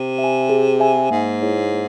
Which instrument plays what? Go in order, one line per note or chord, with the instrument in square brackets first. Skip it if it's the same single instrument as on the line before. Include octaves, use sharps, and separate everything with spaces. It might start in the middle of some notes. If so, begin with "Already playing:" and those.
Already playing: [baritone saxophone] C3
[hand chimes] E5
G#5
G#4
E5 G#5
[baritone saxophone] G#2 [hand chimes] A#3
[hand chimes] E4 G#4 C#5
A#3